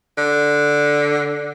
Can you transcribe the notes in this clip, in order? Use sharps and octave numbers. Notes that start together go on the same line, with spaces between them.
D3